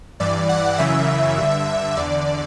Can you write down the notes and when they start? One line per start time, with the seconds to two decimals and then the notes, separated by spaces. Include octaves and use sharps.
0.20 G2 E3 D5
0.49 F#5
0.78 F#2 C#3 E3 E5
1.37 G2 D3
1.97 E2 D3 D5